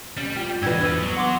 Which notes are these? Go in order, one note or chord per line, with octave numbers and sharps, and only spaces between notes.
G3 C#4
F4 G4
E2 G#2 D4 F#4 B4 E6 G#6
B3 B4 E6 D#7
F#3
F#5 C6 D6